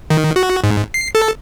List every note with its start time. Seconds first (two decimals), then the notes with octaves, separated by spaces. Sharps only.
0.10 D#3
0.36 F#4
0.64 G#2
0.94 C7
1.15 A4